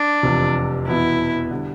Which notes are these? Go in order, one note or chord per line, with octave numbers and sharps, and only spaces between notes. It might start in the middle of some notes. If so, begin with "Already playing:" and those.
Already playing: D4
F1 E2 C3 F3
E2 B2 B3 E4
D3 G3